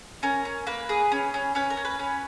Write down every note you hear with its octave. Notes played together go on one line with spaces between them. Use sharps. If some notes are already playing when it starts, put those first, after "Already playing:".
C#4 A#4
C#4
A#3 B4
G#4
C#4
C#4
C#4 B4
A#4
C#4
B4
C#4